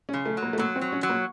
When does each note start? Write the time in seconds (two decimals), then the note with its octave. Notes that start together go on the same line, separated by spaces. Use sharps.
0.09 C#3 C#4
0.26 A3
0.37 F#3
0.43 A#3
0.53 A3
0.58 F#3 A#3
0.76 C4
0.81 F#3
0.92 C#4
1.03 F#3
1.09 A#3